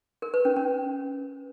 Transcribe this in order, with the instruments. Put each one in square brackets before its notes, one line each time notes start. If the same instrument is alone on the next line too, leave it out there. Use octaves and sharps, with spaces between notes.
[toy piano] A#4
B4
C#4
C#4